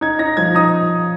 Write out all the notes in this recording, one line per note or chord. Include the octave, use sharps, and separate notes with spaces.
D#4 G#6
D#4 A#6
F3 G#6
D#4 D#6